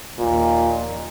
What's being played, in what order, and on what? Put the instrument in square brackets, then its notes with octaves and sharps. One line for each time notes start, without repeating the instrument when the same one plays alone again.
[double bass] A#1 D#2 [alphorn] A#2